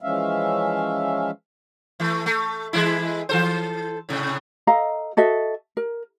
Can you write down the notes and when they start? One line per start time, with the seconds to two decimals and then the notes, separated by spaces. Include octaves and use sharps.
0.02 E3 F3 G#3 C#4 E5 F5
2.00 E3 A3
2.26 A3
2.73 E3 G#3 E4
3.29 E3 A4 C5
4.09 A2 C3
4.67 A4 D#5 F5 A#5
5.17 F#4 A4 D#5 E5
5.77 A#4